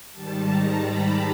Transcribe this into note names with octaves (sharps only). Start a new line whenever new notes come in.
G#2 D#3 G3 A5
A#5
B5